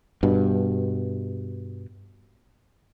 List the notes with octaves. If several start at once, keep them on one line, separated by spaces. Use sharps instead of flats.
G2 B2